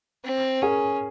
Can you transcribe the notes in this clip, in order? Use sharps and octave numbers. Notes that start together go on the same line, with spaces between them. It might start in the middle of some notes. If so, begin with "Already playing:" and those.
C4
C#4 G#4 A#4